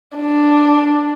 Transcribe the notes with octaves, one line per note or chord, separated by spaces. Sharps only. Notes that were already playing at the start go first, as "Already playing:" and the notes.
D4